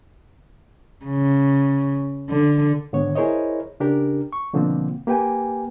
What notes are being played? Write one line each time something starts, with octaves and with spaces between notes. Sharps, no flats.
C#3
D3
G#2 D3 D#3 B3 C#5
E4 G#4 A#4 C5 C#5 D#5
C#3 D4 G4 A#4
C#6
B2 D3 F3 A#3 C4
A#3 G4 B4 G5 G#5